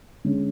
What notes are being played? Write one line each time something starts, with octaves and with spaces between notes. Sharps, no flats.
D3 G#3 C#4